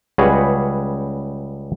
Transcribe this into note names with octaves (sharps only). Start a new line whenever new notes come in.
C#2 G3 F#4 G#4 B4 C#5